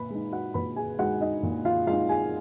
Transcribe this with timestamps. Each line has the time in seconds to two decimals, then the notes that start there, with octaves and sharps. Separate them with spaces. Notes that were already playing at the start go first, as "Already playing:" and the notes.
Already playing: A#2 B4 B5
0.10 G#3 D#4
0.32 F#4 F#5
0.54 A#2 B4 B5
0.76 G#4 G#5
0.98 G#3 D#4 F#4 F#5
1.21 D#4 D#5
1.43 A#2
1.65 F4 F5
1.87 G#3 D#4 F4 F5
2.09 G#4 G#5